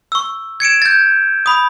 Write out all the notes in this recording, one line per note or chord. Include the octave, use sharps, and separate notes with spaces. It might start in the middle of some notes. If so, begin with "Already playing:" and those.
C#6 E6
G#6 C#7 D7 E7
G6 A6
B5 D#6